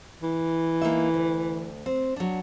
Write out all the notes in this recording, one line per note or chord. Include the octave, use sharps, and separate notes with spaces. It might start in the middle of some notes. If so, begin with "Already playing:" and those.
E3
A#3 D#4 E5
D2
C4
F#3 D4